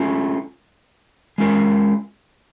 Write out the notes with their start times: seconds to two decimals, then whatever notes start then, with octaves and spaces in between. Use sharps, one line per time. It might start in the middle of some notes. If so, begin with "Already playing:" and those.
Already playing: A3 C#4 F4
1.38 G#3 C#4 F4 A#4